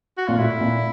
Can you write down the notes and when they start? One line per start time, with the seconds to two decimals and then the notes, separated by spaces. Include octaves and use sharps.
0.18 F#4
0.28 A#2 F4
0.37 A2 E4
0.61 A#2